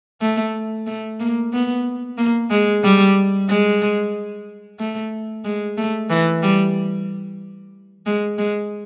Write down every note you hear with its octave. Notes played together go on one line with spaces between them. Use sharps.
A3
A3
A#3
B3
A#3
G#3
G3
G#3
A3
G#3
A3
E3
G3
G#3
G#3